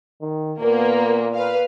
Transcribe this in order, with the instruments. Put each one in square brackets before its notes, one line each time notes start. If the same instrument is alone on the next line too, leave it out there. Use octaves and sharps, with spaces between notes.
[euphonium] D#3
[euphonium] A#2 [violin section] A#3 B3
[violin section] B4 F5